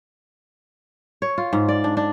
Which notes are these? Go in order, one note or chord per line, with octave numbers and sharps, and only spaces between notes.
C#5
F4
G#2
D5
D4
D4